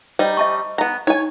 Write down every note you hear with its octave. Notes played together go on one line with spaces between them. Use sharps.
G3 D#4 C5
D#5 A5 C#6
B3 A#5
D#4 C#5 G#5